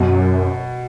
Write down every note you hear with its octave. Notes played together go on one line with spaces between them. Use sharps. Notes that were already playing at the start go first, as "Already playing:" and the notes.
Already playing: F#2 B2